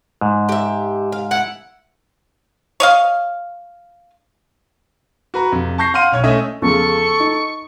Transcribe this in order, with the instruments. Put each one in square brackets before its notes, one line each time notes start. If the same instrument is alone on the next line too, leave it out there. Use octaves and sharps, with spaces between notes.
[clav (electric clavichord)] G#2
[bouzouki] G4 E5
F5
[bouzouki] E4 [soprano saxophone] F#5
[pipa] C#5 D#5 F5
[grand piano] F#4 B4 A#5
F2 C3
A5 C#6 G6 A#6 C7
F5 F#5 C6 F6 D#7
B1 C#5 G#6
A3 C#4 D#5 E5
[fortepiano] E2 C#3 F3 [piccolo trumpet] A4 [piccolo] C#6
[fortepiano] D#4